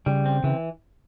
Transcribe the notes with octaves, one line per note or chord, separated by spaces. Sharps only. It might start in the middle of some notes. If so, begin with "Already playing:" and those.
C#3 G3
C4
C#3 E3